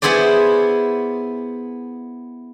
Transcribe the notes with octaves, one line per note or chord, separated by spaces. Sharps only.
B3 E4 G#4 C5 D5